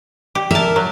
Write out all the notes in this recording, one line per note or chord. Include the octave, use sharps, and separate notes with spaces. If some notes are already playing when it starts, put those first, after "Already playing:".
G4
A#4 E5 A5
F#3